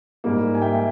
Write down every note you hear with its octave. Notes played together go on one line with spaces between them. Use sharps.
G#2 G3 A#3
G#5
E5 G5